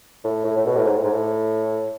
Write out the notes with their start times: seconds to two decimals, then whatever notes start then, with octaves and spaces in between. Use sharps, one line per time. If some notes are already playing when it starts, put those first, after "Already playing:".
0.24 A2
0.45 A2
0.57 A2
0.66 B2
0.76 A2
0.86 G#2
0.97 A2
1.04 G#2
1.12 A2